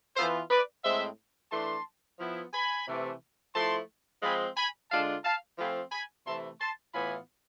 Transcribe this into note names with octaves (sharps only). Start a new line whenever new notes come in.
E3 B3 F4 A4 C5
B4 D5
A2 G#3 C4 C5 E5
E3 A3 D4 A5 C6
F3 B3 E4
G#5 B5
C3 E3 A3
F3 A3 E4 A5 C6
F3 G#3 C4 F4 G#5 B5
G#5 B5
D3 G#3 D4 F4 F5 A5
F5 A5
F3 A3 C4 F4 G#5 B5
G#5 B5
C3 E3 A3 E4 A5 C6
A5 C6
A2 E3 B3 F4 G#5 B5